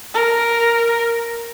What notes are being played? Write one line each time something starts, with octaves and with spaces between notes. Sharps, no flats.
A#4